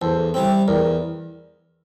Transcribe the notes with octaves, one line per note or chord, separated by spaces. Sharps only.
E2 A4 C5
C3 G3 C4
E2 A#4 D5